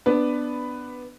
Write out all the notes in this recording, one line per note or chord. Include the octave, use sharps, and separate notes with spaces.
B3 D4 B4